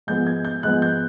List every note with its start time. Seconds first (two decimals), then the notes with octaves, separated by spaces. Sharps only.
0.07 G#2 F3 G#3 B3 G6
0.27 G#6
0.45 G6
0.63 G#2 F3 G#3 B3 F#6
0.82 G6